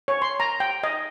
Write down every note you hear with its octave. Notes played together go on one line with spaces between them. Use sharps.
C#5
C6
A#5
G5
D#5